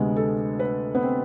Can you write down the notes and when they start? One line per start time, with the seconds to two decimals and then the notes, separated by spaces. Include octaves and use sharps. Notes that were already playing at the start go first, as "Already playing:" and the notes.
Already playing: D2 C3 G#3 B3
0.16 A4
0.59 B4
0.95 B3
1.02 C4